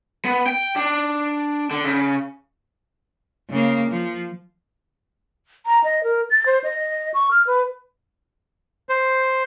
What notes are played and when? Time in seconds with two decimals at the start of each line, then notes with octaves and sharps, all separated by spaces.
0.25 B3
0.47 G5
0.76 D4
1.71 D3
1.84 C#3
3.49 C#3 A#3
3.89 F3
5.66 A#5
5.84 D#5
6.04 A#4
6.30 A6
6.46 C5
6.64 D#5
7.14 C#6
7.31 F6
7.47 B4
8.89 C5